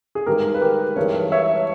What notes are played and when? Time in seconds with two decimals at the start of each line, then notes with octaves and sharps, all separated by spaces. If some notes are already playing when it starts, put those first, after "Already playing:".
0.15 G#4
0.26 G2 D#3 G#3 G4 A#4
0.54 B4
0.61 G4 A#4
0.96 G2 E3 G#3 A#4 C#5
1.32 C#5 E5